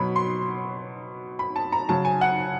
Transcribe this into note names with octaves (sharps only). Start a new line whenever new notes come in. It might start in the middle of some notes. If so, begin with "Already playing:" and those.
Already playing: B2 F#3 B5
C6
B5
A5
A#5
C#3 F#3 A5
G#5
F#5